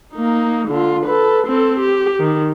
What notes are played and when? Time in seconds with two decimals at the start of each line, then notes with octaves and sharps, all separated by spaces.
0.14 A#3 D#4
0.68 D3 F4
1.06 A4 B4
1.47 C4 A4
1.80 G4
2.20 D#3